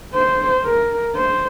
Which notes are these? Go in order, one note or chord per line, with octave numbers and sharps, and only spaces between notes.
C5
A#4
C5